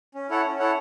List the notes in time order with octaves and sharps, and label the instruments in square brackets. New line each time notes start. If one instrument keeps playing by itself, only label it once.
[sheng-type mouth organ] C#4
E4 A4 C#5 F#5
C#4
E4 A4 C#5 F#5